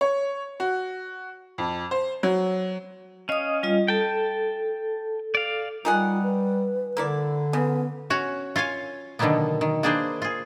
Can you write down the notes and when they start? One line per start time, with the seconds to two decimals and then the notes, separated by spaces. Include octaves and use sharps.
0.01 C#5
0.60 F#4
1.58 F2
1.91 C5
2.23 F#3
3.29 C#4 D#5 F5 D#6
3.63 G3 F4 D#5
3.88 A4 G5 A5
5.35 D5 F5
5.85 D#3 G3 F4 G#4 F#5
6.23 B4
6.97 D3 A#3 E4 D5
7.53 C#3 B3
8.10 C#4 F#4 C#5
8.56 F4 C#5 F5 G#5
9.19 B2 D3 D#3 F#3 A#3 B3
9.61 D#3
9.83 A#3 D4 G#4 B4 C5
10.22 F4 G#4